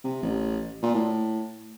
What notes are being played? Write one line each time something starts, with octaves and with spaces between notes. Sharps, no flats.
C3
A1
A#2
A2